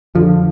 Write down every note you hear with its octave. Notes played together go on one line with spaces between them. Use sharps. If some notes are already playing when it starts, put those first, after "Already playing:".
F2 D3 F3